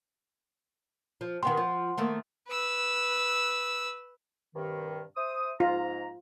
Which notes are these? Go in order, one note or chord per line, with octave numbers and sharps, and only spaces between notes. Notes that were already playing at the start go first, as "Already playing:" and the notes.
F3
D#3 B3 G4 F#5 C6
F3
D#3 A3 A#3
B4 E6
G2 C3 D#3
C5 E5 D#6
G#2 F4 A#5